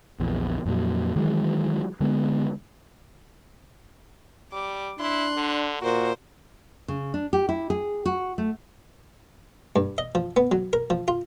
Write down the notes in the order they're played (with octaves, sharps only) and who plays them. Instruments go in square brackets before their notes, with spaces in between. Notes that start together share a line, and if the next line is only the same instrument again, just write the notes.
[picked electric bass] A#1 E2
F2 A#2 F#3
D#3 E3 F#3 G#3
D3 G#3 B3
[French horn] G3 [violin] D6
[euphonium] D4 [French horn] E4 [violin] C6 F#6
[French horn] D3
[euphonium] A#2 [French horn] F#4 [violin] A#4 C5
[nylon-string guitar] C#3
D4
G4
E4
G#4
F#4
A3
[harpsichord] G2
D#5
F3
B3
F#3
A#4
F3
F4